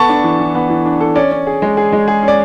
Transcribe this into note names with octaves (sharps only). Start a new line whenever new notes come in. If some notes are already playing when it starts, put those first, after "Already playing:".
Already playing: B3 A4 A5 C#6
D4
E3
E3
B3
E3
D4
A4
C#4 D5
C#4
G#4
G#3
G#4
G#3
G#4
C#4
D5